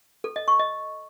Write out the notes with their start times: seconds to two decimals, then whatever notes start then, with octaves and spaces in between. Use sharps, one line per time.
0.24 A4
0.36 D#5
0.48 C#6
0.59 D#5